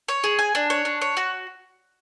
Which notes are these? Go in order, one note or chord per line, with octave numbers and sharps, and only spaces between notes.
C#5
G#4
G#5
D4
C#5
D4
C#5
F#4